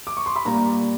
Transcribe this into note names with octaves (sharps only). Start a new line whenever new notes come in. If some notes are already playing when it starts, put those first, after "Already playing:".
D6
C#6
C6
B5
A#2 G3 A#3 A#5